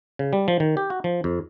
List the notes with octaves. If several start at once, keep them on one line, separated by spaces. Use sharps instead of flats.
C#3
G3
F3
D#3
G4
F#4
F3
F2